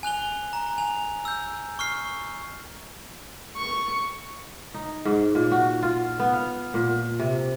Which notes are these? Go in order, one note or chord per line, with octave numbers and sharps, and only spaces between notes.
G#5 F#6 F7 G7
A#5
G#5 F7
E6 G6
C#6 F6 C7
C#6
D#4
G#2
A#2
F#4
F4
B3
F5
A#2
C3